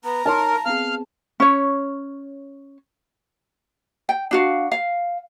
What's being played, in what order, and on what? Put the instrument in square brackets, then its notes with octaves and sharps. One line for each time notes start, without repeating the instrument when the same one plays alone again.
[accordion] B3 [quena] A#5
[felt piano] D#4 C#5 C6 [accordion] A#4 [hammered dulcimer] A5
[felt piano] B3 C4 G#4 [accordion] F5 F6
[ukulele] C#4 C#5
G5
D4 F#4 F5
F5